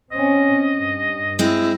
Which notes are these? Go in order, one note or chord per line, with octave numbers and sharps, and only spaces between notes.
C4 C#4 D#5
G2
G#3 C4 E4